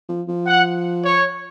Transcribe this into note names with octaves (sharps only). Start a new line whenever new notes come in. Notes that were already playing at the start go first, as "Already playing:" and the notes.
F3
F3
F#5
C#5